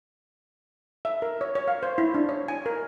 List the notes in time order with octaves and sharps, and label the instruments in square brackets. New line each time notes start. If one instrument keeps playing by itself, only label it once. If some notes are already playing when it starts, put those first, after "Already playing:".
[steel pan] E5
A#4
C#5
C#5
F5
C5
E4
D4
C#5
G#5
A#4